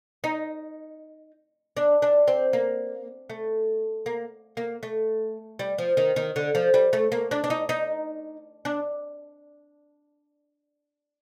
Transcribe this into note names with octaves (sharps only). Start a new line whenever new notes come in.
D#4
D4
D4
C4
A#3
A3
A#3
A#3
A3
G3
F3
D#3
D#3
D3
F3
G3
A3
A#3
D4
D4
D#4
D#4
D4